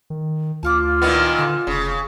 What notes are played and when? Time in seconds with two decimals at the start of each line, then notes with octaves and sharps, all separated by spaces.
0.10 D#3
0.63 D2 F4 A5 C#6 D6
1.02 A#2 D#3 B3 E4 F#4
1.38 D3 A5 C6
1.67 F1 C#3